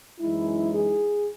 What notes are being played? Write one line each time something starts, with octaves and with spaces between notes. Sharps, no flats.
F#2 E3 G#3 D#4 E4
G#4